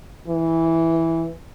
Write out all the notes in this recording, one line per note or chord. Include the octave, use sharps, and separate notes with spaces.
E3